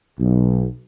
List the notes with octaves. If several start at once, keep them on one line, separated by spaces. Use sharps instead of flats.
B1